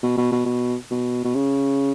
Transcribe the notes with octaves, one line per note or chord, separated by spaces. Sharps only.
B2
B2
B2
B2
B2
B2
C#3